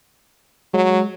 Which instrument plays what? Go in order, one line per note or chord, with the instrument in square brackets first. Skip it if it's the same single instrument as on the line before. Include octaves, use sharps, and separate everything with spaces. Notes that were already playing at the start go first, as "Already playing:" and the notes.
[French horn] F#3 [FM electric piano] G#3